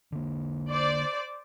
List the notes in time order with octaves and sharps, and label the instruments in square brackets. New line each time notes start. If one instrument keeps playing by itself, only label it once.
[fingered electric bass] D3 A#3
[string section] C5 D5 D6